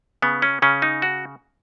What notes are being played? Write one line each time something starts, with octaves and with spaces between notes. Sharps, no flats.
C#3 B3
C#4
C#3 C#4
D#4
F#4